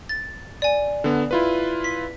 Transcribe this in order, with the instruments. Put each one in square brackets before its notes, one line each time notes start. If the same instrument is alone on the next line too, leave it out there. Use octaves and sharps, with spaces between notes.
[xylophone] A6
D5 G#5
[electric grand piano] D3 B3
E4 F4 B4
[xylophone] B6